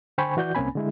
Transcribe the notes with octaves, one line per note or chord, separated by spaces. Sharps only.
D3 C5 G5 G#5 B5 C#6
E3 F#4 D5 G6
C2 A#3 C4 C#4 G#5 B5
D3 G#3 E4